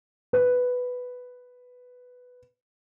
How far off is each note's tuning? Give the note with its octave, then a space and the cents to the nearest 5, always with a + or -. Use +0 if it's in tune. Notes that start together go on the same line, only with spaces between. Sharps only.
B4 +5